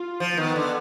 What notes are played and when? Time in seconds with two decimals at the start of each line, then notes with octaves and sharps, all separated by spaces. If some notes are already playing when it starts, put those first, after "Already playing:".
Already playing: F4
0.20 F3
0.37 D#3 B3
0.56 D3